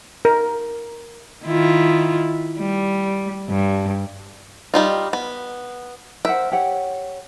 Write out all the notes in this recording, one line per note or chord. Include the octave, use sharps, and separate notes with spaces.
A#4
D#3 E4 F4
G3
G2
G3 D#4 F4
B3
A#4 C5 E5 F#5
G4 C#5 F#5